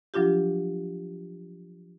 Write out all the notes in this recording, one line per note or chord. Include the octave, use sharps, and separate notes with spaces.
F3 F#3 D4 F4 G4